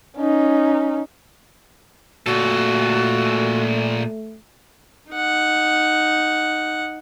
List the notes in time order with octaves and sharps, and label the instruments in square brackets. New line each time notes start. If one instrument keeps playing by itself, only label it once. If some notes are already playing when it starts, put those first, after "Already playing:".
[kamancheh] C#4 D#4
[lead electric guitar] A#2 A4 [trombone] A3 [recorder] F#4
[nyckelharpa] D#4 F#5